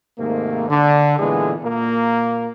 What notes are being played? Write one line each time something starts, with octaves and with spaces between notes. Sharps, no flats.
G#2 C3 D#3 A3 A#3
D3
A#2 D3 E3 G#3 B3 G#4
A#2 A#3